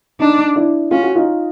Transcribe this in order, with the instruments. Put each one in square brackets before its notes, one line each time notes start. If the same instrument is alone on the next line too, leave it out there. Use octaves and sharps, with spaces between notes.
[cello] D4 [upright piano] D#4
[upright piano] D4 E4
[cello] C#4 [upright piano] F4
[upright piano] F#4
D#4 F4